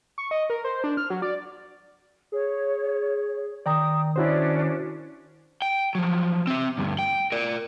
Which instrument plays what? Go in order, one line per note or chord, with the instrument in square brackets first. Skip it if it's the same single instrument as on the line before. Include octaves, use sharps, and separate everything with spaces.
[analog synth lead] C#6
D#5
A#4
C5
D4
F6
F#3
D5
[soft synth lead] G#4 [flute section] C#5
[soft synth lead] D#3 [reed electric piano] D5 G5 A#5 [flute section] D#6
[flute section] C#4 D4 D5 [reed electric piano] E4 F#4 C5
[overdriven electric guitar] G5
F3 F#3
C4 E5
D2 G2
G5
A#4 D5